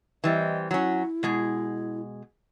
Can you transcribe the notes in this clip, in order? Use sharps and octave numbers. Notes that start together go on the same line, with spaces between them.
E3 G3 C4 D#5
F#3 C#4 E4
B2 G#3 G#4